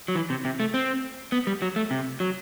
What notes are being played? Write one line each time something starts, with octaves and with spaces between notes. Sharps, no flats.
F#3
E3
C3
C3
A3
C4
B3
G3
F#3
A3
C3
F#3